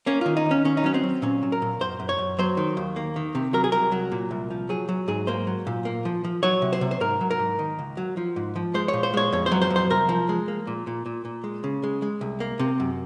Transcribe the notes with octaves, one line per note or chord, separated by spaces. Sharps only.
A#3 C#4
D#3 F4
D#4
D#2
C#4
D#3 C#4
D#4
F#3 C#4
C4
F#3
A#2 C#4
F#3
A#4
A#2
F#2 C5
F#2
C#5
F#2
F#3 C5
D#3
D#2
A#3
D#3
C3
F#3 A#4
G#4
C2 A#4
F#3
A#2
C2
F3
F#3 G#4
F#3
G#2 G#4
A#3 C5
F#3
A#2
A#3
F3
F3
F#3 C#5
C3
C5
C3
C5
G#2 A#4
F#3
A#4
G#2
D#3
C#2
F#3
F3
G#2
F3
G#3 C5
A#2 C#5
C5
G#3 C#5
F2 C#5
C5
F#3
C5
F2
C5
C2 A#4
F3
G#3
A#3
A#2
A#2
A#2
A#2
G#3
C#3
G#3
G#3
C2
A#3
C3
F#2